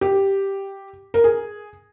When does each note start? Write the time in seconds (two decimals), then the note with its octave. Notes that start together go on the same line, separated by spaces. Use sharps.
0.01 G4
1.14 A#4
1.24 G#4